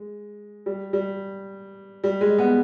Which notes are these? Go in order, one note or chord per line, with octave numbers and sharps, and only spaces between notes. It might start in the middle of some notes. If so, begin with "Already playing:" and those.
Already playing: G#3
G3
G3
G3
G#3
B3